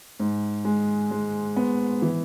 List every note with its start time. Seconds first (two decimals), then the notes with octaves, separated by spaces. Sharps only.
0.20 G#2
0.65 G#3
1.11 G#3
1.56 B3
2.02 E3